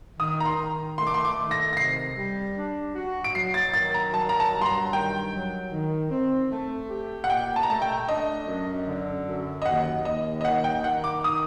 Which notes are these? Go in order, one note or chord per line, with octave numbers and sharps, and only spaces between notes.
D#3 D#6
A#5
C6
D#3
A3 C6
D6
C6
D6
D#3
A#6
A#6
C3 C7
G3
D4
F#4
D7
F#3 C7
A6
D#3 A6
A#5
F#3 A5
A#5
A5
G2
C6
A#5
D#3 G5
F#3
D#3
C4
A3
G4
F#5
A#2 G5
A5
A#5
A3 A5
G5
D4 D#5
F#2
D3
F#2
D#5
D#2 F#5
D#2 D#5
D#5
D#3 F#5
G5
D#3 F#5
D6
D#4 D#6